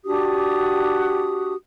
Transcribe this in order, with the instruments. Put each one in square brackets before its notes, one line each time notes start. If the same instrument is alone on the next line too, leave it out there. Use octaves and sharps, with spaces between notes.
[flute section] D4 F#4 G4 D#6